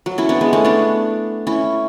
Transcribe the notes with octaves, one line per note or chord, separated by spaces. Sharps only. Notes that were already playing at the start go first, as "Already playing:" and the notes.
F#3
C#4 E4
B3 D4
G#3 B3
A3 C#4
B3 D4
C#4 E4